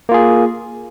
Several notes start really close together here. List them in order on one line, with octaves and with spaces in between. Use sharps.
A#3 F4 G#4